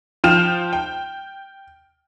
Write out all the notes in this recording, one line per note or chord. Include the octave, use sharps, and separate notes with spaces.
F3 F4 G5 F6 E7
G5